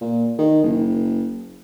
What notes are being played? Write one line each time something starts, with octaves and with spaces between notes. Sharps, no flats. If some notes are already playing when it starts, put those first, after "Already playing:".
A#2
D#3
F#1